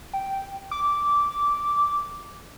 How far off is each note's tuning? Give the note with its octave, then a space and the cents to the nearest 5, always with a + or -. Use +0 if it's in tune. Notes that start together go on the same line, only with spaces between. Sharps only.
G5 -5
D6 -10